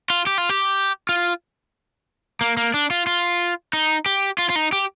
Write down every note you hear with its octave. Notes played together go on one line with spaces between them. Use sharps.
F4
G4
F4
G4
F4
A#3
A#3
D4
F4
F4
D#4
G4
F4
F4
D#4
G4